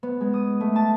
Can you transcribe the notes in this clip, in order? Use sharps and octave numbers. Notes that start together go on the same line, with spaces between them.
B3
G#3
D#6
A3
A5